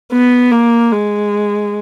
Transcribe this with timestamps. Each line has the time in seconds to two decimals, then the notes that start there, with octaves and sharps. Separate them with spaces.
0.12 B3
0.51 A#3
0.92 G#3